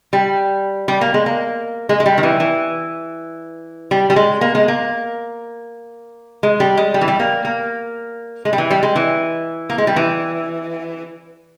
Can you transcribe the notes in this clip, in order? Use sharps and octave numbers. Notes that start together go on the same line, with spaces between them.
G3
G3
A#3
G#3
A#3
G#3
G#3
G3
D#3
E3
E3
G3
G3
G#3
A#3
G#3
A#3
G#3
G3
G#3
G3
E3
G3
A#3
A#3
G#3
G3
E3
G3
G#3
E3
A#3
G#3
G3
E3